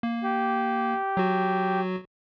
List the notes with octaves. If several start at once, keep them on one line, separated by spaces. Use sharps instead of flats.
A#3
G4
F#3 F#4